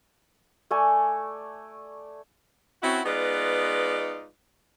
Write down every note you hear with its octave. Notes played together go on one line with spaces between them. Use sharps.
A3 D5 G#5 C#6
C4 C#4 E4 F#4
G#3 B3 D#4 F4 B4 D5